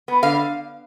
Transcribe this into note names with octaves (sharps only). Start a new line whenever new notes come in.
B3
D3 F5